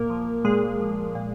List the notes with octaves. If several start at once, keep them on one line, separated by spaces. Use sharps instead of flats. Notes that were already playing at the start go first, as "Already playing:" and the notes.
Already playing: A#2 A#3 A#4
F3
A#2 G#3 G#4
F3
A#2